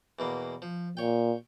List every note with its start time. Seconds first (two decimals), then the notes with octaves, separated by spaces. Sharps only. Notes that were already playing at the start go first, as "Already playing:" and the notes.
0.19 E2 B2 A#3
0.62 F3
0.97 A#2 C#5 G5